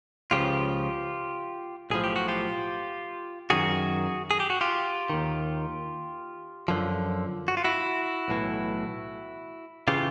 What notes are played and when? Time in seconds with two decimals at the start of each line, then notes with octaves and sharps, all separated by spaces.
0.31 C#2 C#3 F3 F4 G4
1.90 B1 A2 F3 G#4
2.04 G4
2.16 F#4
2.28 F4 G4
3.50 F#2 D#3 F#4 G#4
4.31 G#4
4.40 G4
4.50 F#4
4.61 F4 G4
5.10 D#2 D#3
6.68 F#2 D3 F3
7.48 F#4
7.57 F4
7.64 E4 F#4
8.28 B1 A2 E3
9.88 C#3 E3 F4 G4